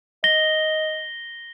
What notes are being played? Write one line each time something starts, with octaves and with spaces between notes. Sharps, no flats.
D#5 A#6 G7